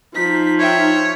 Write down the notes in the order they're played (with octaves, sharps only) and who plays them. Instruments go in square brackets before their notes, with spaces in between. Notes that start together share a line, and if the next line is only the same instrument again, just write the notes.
[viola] F3 [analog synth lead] D#4 [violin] B6
[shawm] C#5 [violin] E5 G5